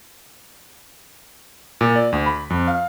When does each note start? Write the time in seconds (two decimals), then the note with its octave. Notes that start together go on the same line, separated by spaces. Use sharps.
1.81 A#2
1.96 D5
2.12 D2
2.26 B5
2.50 F2
2.68 F5